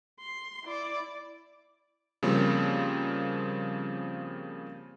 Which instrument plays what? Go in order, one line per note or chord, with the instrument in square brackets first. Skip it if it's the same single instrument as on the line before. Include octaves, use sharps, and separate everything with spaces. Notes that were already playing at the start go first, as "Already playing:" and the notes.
[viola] C6
E4 D5
[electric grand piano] C#3 F3 G3 A#3 C4